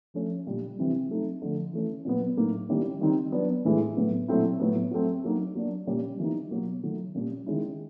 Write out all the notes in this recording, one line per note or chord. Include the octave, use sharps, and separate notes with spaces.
F3 A3 C#4
A#2 G3 A#3 D4
C3 E3 G3 C4
F#3 A3 C4 D#4
D3 F3 A3
E3 A3 C#4
A#2 F#3 B3
A2 F#3 A#3 D#4
D#3 G3 A#3 C#4 E4
D#3 G3 C4 D#4
F#3 B3 D4
A2 E3 G#3
A2 F#3 B3
A#2 F#3 A3 C4 E4
A2 F#3 B3
F#3 A3 C4
F#3 A#3 D#4
F#3 A#3 D4
A#2 G3 A#3 C#4
E3 G3 A#3 D#4
B2 F#3 A#3
D#3 F#3 A3
A#2 G3 A#3 C#4
D#3 G#3 C#4 E4